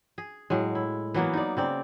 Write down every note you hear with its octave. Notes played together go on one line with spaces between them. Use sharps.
G#4
A2 F#3 G#3
E4
E3 F#3 A#3 B3
D#4 D5
C#3 C4 D5